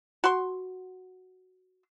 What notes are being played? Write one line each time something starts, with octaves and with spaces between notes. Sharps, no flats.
F#4 C6